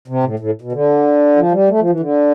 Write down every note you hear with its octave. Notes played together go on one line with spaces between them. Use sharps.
C3
A2
A2
B2
D3
F3
G3
A3
F3
E3
D3